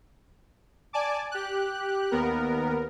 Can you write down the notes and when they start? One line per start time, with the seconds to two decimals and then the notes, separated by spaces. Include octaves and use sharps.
0.93 D5 G#5 A5 D6
1.31 G4 F#6
2.11 D#2 B3 A#4